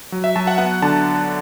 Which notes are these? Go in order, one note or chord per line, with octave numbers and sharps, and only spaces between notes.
F#3
E5
F#3 A5
F#5
B3 F#5
D3 A5